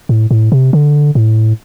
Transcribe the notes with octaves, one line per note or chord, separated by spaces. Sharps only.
A2
A2
C3
D3
A2